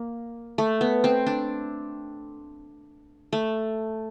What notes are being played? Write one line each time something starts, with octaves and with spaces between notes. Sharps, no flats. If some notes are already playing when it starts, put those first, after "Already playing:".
Already playing: A#3
A3
B3
C4
D4
A3